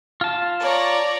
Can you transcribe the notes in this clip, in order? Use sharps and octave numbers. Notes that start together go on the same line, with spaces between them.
F4 A5
C#5 D5 A#5